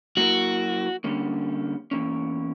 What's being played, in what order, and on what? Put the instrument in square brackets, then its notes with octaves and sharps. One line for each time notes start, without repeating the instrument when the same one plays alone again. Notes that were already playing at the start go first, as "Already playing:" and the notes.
[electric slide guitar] F#3 A#3 E4 A#4 [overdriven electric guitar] F#4
[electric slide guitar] D3 G3 A#3 C#4
E2 B2 A#3 C#4